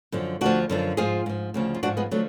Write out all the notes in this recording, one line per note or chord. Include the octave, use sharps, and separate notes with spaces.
F#2 D3 F3
D2 D3 F3 D4 F#4
F#2 D3 F3
G#2 F3 F4 G#4
G#2 F3
D2 C#3 F3
F4
G#2 F3 D4 F#4
G#3 B3
D3 F3 F#3 A3